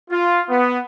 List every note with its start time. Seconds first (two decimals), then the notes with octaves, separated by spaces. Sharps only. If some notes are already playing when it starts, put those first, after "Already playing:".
0.10 F4
0.50 B3